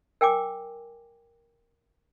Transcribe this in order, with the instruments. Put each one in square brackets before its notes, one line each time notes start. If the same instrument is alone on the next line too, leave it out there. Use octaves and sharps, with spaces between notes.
[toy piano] A#4 G5 G#5 D6